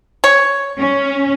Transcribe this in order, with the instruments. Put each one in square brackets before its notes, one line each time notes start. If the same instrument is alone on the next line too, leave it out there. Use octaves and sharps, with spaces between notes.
[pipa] C#5
[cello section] C#4